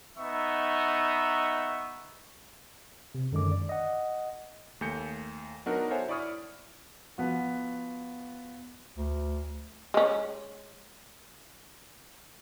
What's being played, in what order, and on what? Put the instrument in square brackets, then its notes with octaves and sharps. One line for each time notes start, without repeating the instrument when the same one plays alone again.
[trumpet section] B3 D#4 E5 C#6
[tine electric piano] C3
F#2 D3 D#3 G#3 C#4 D6
D5
D#5 F#5
[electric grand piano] D#2 A3 G#5 G6 C#7
F#3 B3 D4 D#4 F#4 A#4
A4 C5 C#5 E5 F#5 G#5
E4 D5 B5 C#6 D#6 F6
[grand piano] F3 B3 F#4
[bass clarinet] D2
[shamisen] G#3 C#4